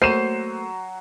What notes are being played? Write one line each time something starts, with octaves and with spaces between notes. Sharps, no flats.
F#3 A3 A#3 C5 C7 D#7 E7